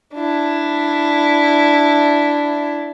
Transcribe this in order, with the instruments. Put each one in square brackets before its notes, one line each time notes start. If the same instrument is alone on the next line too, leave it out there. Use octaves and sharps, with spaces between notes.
[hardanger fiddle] D4 E4